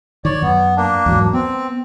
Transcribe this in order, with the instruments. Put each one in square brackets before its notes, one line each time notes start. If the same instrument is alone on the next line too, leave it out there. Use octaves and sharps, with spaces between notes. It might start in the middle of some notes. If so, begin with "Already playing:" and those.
[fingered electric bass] D#3 [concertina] C#5 D5
[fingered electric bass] F#2 [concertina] B3
[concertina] A#3 D4
[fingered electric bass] E2 G#2 F#3
[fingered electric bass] B3 [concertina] C4